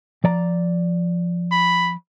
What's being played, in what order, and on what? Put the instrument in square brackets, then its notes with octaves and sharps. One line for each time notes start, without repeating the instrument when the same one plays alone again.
[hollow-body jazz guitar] F3 D5 A#5
[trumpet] B5